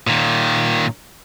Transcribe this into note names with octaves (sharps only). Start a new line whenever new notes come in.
A#2 D#3